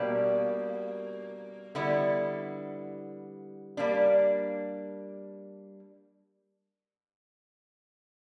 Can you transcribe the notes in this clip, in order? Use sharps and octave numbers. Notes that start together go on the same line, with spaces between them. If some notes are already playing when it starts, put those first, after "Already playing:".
Already playing: B2 G3 A#3 D4
D3 G3 B3 E4
G3 A#3 D4